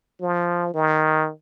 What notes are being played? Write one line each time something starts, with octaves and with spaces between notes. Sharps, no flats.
F3
D#3